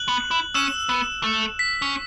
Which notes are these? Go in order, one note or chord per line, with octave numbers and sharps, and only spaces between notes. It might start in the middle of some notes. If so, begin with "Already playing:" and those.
Already playing: F#6 F#7
B3
E4
C#4 E6 E7
B3
A3
B6
C#4